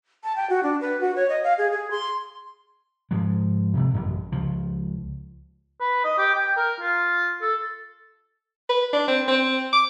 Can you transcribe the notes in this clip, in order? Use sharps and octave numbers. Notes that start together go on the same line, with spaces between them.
A5
G5
F#4
D4
B4
F#4
C#5
D#5
F5
G#4
G#4
C6
G#2 F3 G#3
F2 C3
A1 F#2
C#2 F3
B4
D#5
G4
G5
A#4
F4
A4
B4
D4
C4
C4
D6